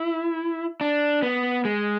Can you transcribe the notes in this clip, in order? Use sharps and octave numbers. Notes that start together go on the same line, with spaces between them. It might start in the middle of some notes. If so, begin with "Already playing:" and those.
Already playing: E4
D4
B3
G#3